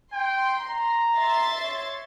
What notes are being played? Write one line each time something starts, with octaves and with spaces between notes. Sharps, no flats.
G5 C6
A#5
E5 C6 A6
C#5